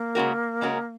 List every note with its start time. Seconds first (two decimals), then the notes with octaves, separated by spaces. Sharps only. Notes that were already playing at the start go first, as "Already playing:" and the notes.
Already playing: A#3
0.15 C#3 G#3 C#4 F#4 A#4
0.61 C#3 G#3 C#4 F#4 A#4